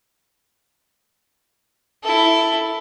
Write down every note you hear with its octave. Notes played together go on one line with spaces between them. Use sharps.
E4 A4